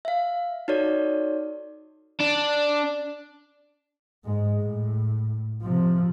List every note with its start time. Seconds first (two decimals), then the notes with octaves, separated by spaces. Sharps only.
0.05 E5 F5
0.68 D#4 F#4 A4 C#5 D5
2.20 D4
4.24 G#2 G#3
4.61 A2
5.62 C3 F3